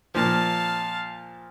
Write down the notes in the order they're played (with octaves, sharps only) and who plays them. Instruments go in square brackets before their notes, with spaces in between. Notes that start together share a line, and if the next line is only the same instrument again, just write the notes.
[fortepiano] A#2 F3 [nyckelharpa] F5 A5